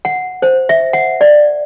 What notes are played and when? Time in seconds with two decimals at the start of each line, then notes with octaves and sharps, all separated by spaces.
0.05 F#5
0.42 C5
0.69 E5
0.93 F#5
1.21 D5